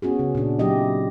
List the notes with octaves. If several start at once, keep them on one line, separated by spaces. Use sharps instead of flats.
B3 C#4 F#4 G#4
C#3
A#2 D4
F#3 C4 E4 G4 D#5